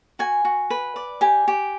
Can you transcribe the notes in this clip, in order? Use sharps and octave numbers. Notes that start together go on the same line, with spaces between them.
F#4 G#5
F#4
B4
D5
G4 G#5
G4